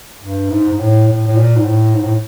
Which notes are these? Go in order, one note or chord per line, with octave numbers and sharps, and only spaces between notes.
G2
G#2
G#2
A2
A2
A2
A#2
G#2
A2
G#2
A2